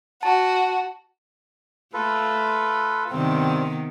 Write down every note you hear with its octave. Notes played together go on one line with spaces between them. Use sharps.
F#4 A5
A3 F4 A4 B4
G2 C3 D#3 B3 C4